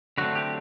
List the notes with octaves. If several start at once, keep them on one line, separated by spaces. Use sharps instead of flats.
D3 F#3 A3 C4 F#4
G4